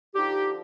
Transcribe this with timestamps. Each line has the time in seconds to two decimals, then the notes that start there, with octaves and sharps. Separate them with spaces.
0.15 D3 F3 D#4 G4